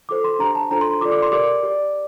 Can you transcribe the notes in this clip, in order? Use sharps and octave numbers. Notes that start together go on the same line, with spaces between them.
F4 A4 C5 D6
C6
D4 G4 C5 A#5
A5
D4 F4 A4 C5 A#5
C6
F4 A4 D5 D6
D6
C6
G4 A#4 D5 D6
G4 D5